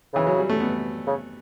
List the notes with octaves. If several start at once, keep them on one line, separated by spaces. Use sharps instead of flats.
C#3 E3
F#3
G3
A3
B3
C#3